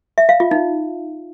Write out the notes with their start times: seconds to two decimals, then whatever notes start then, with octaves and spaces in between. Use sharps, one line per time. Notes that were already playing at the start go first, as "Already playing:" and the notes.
0.18 E5
0.29 F5
0.40 F4
0.51 D#4